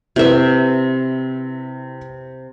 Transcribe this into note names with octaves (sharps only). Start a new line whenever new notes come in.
C3 E4 B4 E5